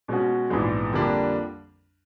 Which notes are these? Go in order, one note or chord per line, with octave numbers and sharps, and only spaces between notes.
B2 G#3 C#4 F#4
A#1 G#2 E3 G#3 B3
F2 D3 G3 A#3 D4